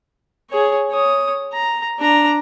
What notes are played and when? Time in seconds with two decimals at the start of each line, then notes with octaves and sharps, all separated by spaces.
0.50 G#4 C#5
0.91 C#5 D#6
1.53 A#5
1.99 D4 A#5